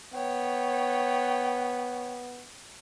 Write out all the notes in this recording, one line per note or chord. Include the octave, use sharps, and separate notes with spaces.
B3 C#5 G5